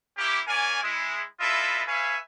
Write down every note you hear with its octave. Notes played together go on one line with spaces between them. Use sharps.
A#3 C#4 E4 G4
C#4 A#4 D5 F5 G#5
G#3 E4
E4 F4 A4 B4 D#5 E5
B4 C#5 E5 F5 G#5